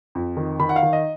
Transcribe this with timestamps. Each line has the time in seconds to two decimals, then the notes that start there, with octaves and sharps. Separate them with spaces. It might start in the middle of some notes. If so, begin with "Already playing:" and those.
0.15 F2
0.37 D#3
0.60 D#3 B5
0.69 F#5
0.76 F5
0.83 D#3
0.93 D#5